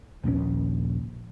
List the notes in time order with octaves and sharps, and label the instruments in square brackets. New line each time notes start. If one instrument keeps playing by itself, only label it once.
[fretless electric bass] D#1 A#1 G#2 C#4